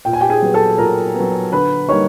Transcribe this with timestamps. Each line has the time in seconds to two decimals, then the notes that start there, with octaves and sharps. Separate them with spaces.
0.05 A#2 G5
0.13 G#5
0.21 G4 G5
0.30 G#4 G#5
0.43 F#3 B3
0.54 A4 A5
0.78 A#2 A#4 A#5
1.15 B3
1.20 F#3
1.52 D3 B4 B5
1.89 G3 A#3 D#4 C#5 C#6